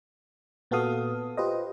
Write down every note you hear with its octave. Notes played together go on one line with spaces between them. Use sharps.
A#2 B3 F#4 A4 F5 D#6
F4 G4 B4 C5 D#5